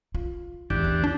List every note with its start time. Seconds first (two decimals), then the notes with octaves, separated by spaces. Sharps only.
0.14 F4
0.70 A1 E2 D4 G4
0.84 D2
1.04 D4